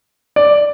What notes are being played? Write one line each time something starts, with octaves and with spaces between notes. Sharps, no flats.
D5